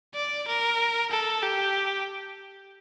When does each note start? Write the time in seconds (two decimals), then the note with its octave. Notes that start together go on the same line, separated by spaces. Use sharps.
0.14 D5
0.47 A#4
1.11 A4
1.42 G4